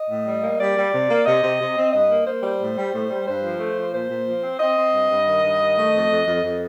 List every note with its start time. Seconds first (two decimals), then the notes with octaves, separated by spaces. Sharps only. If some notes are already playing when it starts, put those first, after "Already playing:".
Already playing: D#5
0.10 A2
0.26 G3
0.43 A#3
0.60 G3 D5
0.77 G3
0.93 C3
1.10 A#3
1.26 C3 D#5
1.43 C3
1.60 C3
1.77 C4
1.93 G2 D#5
2.10 A#3
2.26 A#3 C5
2.43 G3
2.60 A2
2.76 G3
2.93 A2
3.10 G3
3.26 G2 C5
3.43 F3
3.60 A3
3.77 F3
3.93 A#2 C5
4.09 A#2
4.26 F3
4.44 C4
4.60 C4 D#5
4.76 C4
4.93 G2
5.10 G2
5.27 D#3
5.43 G2
5.60 D#3
5.77 A3
5.94 F2
6.09 F2
6.26 F2
6.43 F2